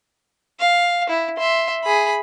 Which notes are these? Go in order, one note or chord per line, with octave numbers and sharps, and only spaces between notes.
F5
E4
E5 C6
G#4 B5